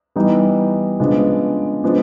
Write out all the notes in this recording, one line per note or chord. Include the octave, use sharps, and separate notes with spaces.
E3 G3 B3 D#4
C#3 F3 G#3 B3 D4
F3 G#3 B3 D4